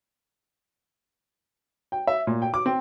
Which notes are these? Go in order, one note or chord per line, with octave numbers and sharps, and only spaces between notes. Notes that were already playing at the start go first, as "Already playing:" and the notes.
G5
E5
A#2
G5
D6
C4